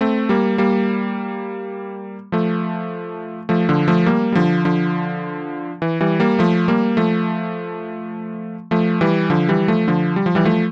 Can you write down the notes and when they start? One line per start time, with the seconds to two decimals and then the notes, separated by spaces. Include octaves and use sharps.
0.01 A3 C4
0.29 G3 A#3
0.58 G3 A#3
2.32 F3 A3
3.49 F3 A3
3.69 D3 F3
3.88 F3 A3
4.06 G3 A#3
4.32 G3
4.35 D3 F3
4.65 D3 F3
5.82 E3
6.01 E3 G3
6.20 G3 A#3
6.39 F3 A3
6.68 G3 A#3
6.97 F3 A3
8.71 F3 A3
9.01 E3 G3
9.30 D3 F3
9.49 E3 G3
9.68 F3 A3
9.88 D3 F3
10.16 G3
10.26 F3
10.35 E3 G3
10.45 F3 A3